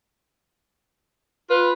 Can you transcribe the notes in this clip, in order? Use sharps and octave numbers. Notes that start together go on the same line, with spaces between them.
F4 B4